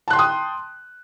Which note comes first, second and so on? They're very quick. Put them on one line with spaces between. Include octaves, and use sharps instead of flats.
A5 F#6 C6 G5 D#6